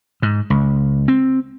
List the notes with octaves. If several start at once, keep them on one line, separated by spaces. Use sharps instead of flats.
G#2
C#2
C4